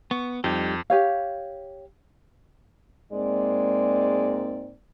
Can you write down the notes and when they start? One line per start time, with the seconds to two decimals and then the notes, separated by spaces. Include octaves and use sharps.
0.11 B3 C#6
0.44 F2 G3 D#4 G4
0.90 G4 C#5 F5
3.13 G#2 G#3 A#3 C4 D5